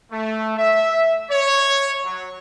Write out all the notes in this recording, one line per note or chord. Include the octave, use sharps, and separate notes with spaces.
A3
E5
C#5
F#3